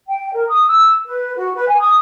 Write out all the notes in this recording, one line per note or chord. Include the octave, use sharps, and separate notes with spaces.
G5
A#4
D#6
E6
B4
F#4
B4
G#5
D#6